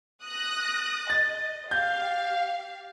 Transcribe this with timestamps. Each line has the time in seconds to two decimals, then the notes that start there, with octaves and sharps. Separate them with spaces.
0.24 D#6 F#6 A#6
1.10 D#5 A6
1.71 G4 F5 G6